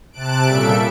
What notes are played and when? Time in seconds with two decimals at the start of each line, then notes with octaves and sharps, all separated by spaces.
0.12 C3 A5 F#6 D7
0.46 A#2 C#3 G3 A4 E5 D7